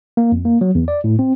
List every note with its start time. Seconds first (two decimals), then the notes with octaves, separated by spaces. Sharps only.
0.17 A#3
0.32 F2
0.45 A#3
0.61 F#3
0.75 E2
0.88 D5
1.04 A2
1.19 C4